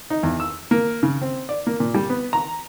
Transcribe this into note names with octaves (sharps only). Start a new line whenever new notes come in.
D#4
E2
E6
A#3
C#3
C4
D5
A#3
A#2
G3
B3
A#5